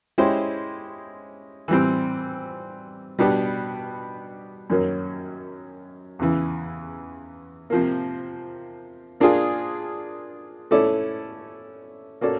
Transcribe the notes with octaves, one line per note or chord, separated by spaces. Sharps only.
G#3 C#4 E4 G4 C5
E3 G3 C4
B2 G3 B3 D4 G4
F#2 D#3 F#3 A#3 C#4
E2 C#3 E3
C3 F3 A#3
A#3 D4 F4 G#4
A3 C#4 E4 A4 D5
A#3 C#4 F#4 A4 D5